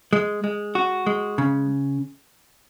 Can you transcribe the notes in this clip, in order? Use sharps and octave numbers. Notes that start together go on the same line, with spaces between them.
G#3
G#3
F#4
G#3
C#3